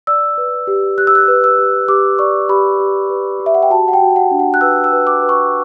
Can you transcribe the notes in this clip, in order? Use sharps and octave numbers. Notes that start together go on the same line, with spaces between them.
D5 E6
B4
G4
G4 F#6
E6
F#6
B4
E6
G4
G4 D6
D5 C#6
G4 B5
G4
B4
G4
E5
F#5
G5
F#4 A5
F#5
G5
F#4
F#5
D4
F#5
F#6
B4 E6
E6
B4
D6
B4
C#6